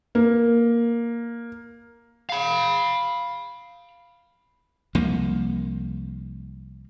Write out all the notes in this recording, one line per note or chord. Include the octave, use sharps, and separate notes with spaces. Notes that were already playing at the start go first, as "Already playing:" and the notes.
A#3
F5 B5
C2 F3 A#3